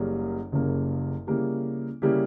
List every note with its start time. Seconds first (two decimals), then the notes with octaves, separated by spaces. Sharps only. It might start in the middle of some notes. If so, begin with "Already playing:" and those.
Already playing: F#1 F#2 C#3 G3 A#3
0.52 F#1 F#2 C#3 G3 A#3
1.27 C#3 G3 A#3 E4 G4
2.02 C#3 G3 A#3 E4 G4